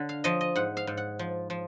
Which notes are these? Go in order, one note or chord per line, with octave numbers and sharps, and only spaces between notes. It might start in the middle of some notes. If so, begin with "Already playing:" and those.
Already playing: D3
F5
F3 D#5
D#5
G#2 F#5
F5
G#2
F#5
F3
F3